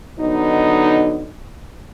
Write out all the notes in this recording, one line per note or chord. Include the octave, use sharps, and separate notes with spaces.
D3 F#3 B3 D#4